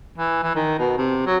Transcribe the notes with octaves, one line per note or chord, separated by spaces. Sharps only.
E3
E3
D#3
B2
C3
F#3